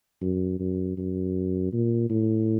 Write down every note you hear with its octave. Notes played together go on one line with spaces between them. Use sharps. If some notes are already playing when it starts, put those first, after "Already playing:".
F#2
F#2
F#2
A#2
A2